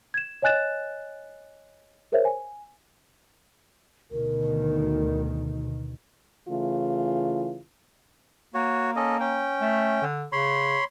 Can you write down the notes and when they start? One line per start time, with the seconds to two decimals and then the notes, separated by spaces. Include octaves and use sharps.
0.14 G#6 E7
0.42 C#5 D#5 G#5 F#6 A6 E7
2.12 G#4 A#4 C5 C#5 E5
2.25 G#5
4.11 D2 B2 D#3 A#4
6.49 C#3 E3 A3 E4 F4
8.54 A#3 F#4 C#5
8.96 C#4 A4 D#5
9.20 C#4 G5
9.61 A3
10.02 D3
10.32 C#3 C#5 B5 C6